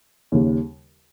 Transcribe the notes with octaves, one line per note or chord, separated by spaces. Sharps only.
D#2 C#3 G3